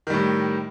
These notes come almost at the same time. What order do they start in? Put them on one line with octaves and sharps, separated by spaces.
D#3 G3 A2